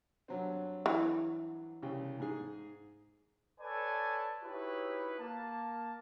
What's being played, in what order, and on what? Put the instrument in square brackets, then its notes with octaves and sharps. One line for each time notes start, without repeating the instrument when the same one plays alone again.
[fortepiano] G2 F#3 C4
[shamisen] E3
[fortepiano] C2 C#3 G5
G#2 G#4
[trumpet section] A4 B4 C#5 D5 G#5 A5
D#4 E4 F#4 G4 B4 C#5
A#3 A5